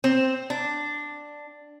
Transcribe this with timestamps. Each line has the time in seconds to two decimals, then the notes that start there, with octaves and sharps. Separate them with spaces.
0.04 C4
0.50 D4